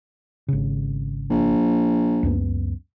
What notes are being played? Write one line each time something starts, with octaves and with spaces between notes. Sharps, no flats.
G#1 C#3
A#1
C#2 F#2 B3